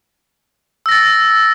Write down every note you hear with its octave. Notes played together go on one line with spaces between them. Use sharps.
E6 A6 A#6